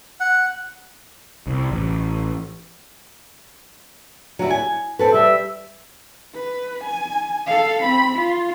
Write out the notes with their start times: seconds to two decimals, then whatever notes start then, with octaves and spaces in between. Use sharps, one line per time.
0.20 F#5
1.47 C2
1.72 A1
4.39 F#3 G3 E4
4.50 G#5
4.99 C4 A4 B4
5.14 G3 E5
6.34 B4
6.84 G#5
7.47 A4 F5
7.83 C4 B5
8.15 F4